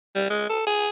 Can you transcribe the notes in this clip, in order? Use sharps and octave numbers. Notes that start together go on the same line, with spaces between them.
G3
G#3
A4
G#4